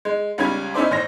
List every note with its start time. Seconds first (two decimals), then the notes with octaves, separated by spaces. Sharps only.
0.05 G#3
0.38 C#2 G3 C#4 G#6
0.74 C#4 D#4 E4 C5 D5
0.91 A1 C5 C#5 A#6